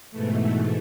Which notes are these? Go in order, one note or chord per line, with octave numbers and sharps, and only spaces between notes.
G#2 B2 E3 A3